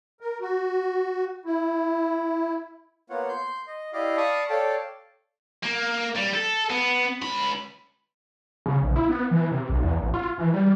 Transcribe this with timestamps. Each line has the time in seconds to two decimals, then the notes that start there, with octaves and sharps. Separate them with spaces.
0.20 A#4
0.41 F#4
1.45 E4
3.10 A#3 B3 F4 C#5 F#5
3.29 C6 G6
3.67 D#5
3.93 E4 G4 D5 D#5 F5
4.17 D5 F5 A5 B5 C#6 D#6
4.50 A4 C#5 D5 F5 G5 A5
5.63 A#3
6.16 G3
6.34 A4
6.70 B3
7.22 C#2 B5
8.66 C#3
8.82 A#1
8.96 E4
9.09 B3
9.31 E3
9.51 C3
9.69 B1
9.83 E2
10.00 A1
10.14 F4
10.38 E3
10.54 G3